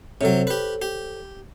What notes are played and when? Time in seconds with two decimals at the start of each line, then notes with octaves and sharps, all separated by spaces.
0.21 C3 F#3 A4 C5 C#5
0.47 G4 B4
0.82 G4